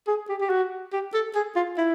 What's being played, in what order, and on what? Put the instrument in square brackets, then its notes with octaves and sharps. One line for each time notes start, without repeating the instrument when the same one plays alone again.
[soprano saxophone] G#4
G4
G4
F#4
G4
A4
G#4
F4
E4